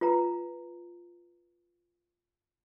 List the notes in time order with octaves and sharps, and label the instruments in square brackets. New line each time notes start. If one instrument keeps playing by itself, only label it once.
[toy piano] F4 B4 A#5